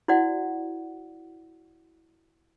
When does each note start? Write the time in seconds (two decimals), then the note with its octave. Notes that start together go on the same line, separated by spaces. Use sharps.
0.08 E4 F#4 C5 D5 F#5